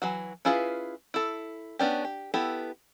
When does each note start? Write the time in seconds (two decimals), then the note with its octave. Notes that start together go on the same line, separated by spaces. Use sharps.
0.02 E3 F#3 F#4
0.45 C#4 E4 F4 G#4 B4
1.14 E4 A4
1.79 B3 C#4 D4 G4
2.05 G4
2.34 B3 E4 G4 A4